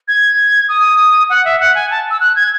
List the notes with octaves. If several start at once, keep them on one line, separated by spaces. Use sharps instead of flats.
G#6
D#6
F#5
E5
F#5
G#5
A5
E6
F#6
G#6